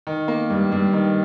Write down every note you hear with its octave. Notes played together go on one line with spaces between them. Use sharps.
D#3
A#3
G2
G2
D#3